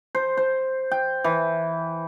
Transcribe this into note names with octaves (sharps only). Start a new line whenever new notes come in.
C5
C5
G5
E3